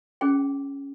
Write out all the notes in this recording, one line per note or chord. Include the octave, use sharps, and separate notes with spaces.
C#4 G#4 G5